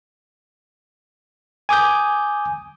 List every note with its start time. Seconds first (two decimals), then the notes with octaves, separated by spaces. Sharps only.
1.69 G#5 D6 D#6 G6